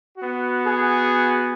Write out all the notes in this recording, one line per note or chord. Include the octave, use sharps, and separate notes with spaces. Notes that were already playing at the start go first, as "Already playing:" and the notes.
B3 F#4
G#4